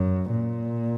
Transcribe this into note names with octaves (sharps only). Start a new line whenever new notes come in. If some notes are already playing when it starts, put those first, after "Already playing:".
Already playing: F#2
A#2